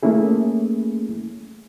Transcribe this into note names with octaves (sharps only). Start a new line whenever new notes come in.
A3 A#3 C#4 E4 G#4